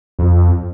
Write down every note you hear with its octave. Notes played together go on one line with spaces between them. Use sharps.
F2